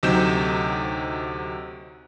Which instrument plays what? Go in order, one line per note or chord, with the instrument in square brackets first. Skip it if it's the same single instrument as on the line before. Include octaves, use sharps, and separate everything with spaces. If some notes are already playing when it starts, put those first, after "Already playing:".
[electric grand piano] D2 C3 F#3 D#4 G6 E7